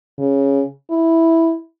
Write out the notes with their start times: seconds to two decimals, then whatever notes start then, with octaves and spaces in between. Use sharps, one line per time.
0.19 C#3
0.91 E4